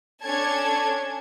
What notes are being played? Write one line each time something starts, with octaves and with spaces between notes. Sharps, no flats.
C#4 D4 A4 C#5 A5 G#6